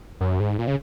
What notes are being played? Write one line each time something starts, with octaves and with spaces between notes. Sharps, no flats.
F#2
G#2
A#2
C#3